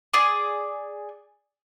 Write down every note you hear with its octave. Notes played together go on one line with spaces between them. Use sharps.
G#4 D5